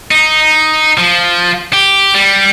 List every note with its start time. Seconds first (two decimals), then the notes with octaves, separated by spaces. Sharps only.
0.11 D#4
0.98 F3
1.73 G4
2.15 G3